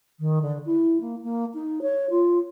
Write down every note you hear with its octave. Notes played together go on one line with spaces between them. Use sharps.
D#3
D3
E4
A#3
A#3
D#4
C#5
F4